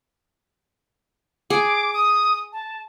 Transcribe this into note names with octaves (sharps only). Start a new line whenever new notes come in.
G#4 D6
D#6
A5